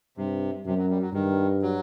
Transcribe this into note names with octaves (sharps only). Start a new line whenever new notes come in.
G2 C3
F#2 C3
F#3
G3
F#3
G2 D#3
F#3